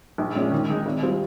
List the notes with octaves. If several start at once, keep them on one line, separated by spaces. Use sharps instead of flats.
A#1
A#2 G#3 C#4
D#2
D#3 G#3 D#4
G#1
G3 C4 F4